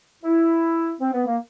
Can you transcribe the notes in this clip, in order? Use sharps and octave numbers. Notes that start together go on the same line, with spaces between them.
E4
C4
B3
A#3